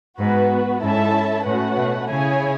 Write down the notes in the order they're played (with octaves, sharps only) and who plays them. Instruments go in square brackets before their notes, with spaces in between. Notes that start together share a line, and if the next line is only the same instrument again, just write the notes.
[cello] G#2 [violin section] B3 F#4 B4
[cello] G#2 [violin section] C#4 E4 A4 E5 A5
[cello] A2 [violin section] A3 C#4 F#4 B4 F#5
[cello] B2
[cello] C#3 [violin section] E4 G#4 C#5 G#5